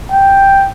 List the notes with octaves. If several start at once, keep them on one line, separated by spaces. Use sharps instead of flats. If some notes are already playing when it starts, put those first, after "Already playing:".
G5